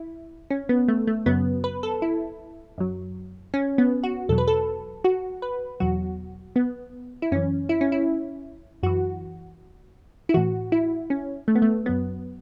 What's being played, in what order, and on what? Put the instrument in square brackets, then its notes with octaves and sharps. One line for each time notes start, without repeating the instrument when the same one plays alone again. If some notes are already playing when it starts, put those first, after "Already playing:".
Already playing: [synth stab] E4
C#4
B3
A3
A3
F#2 C#3 F#3 B3
B4
A4
E4
F#2 F#3
C#4
B3
F#4
E2 B2 F#3 A4
B4
A4
F#4
B4
E2 B2 F#3 F#4
B3
E4
F#2 E3 C#4
E4
C#4
E4
F#2 E3 F#4
E4
A2 E3 F#4
E4
C#4
A3
B3
A3
F#2 F#3 B3